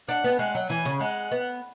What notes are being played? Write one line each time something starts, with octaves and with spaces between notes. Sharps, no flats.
D4 F#5
B3
G#3 F#5
F#3
E3 G#5
C#3
G#3 F#5
B3